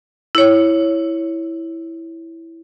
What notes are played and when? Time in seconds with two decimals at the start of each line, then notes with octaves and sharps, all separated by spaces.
0.35 E4 C#5